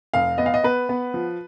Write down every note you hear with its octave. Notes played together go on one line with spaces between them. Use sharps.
F1 F5
B3 D#5
F5
D#5
B3 B4
B3
F3